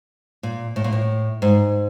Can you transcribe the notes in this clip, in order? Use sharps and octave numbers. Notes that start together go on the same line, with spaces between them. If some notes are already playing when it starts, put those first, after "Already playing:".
A#2
A2
A#2
A2
G#2